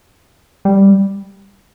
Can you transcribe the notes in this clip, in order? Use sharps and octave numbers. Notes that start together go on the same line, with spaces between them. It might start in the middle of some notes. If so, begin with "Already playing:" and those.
G3